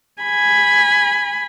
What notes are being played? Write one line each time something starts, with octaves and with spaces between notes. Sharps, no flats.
G#5 B5